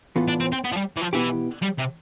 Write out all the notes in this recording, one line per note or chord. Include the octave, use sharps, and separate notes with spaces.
A2 E3 B3 F4 A4
D4
C4
C4
B3
F3
G3
E3
F3
B2 E3 B3 E4 G4
G3
C3